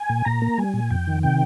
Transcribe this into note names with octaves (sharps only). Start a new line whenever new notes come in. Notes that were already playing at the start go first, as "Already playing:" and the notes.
Already playing: G#5
A#2
A#2 A#5
A#3
G3 G#5
A#2
F2 G5
D#3
C3 G5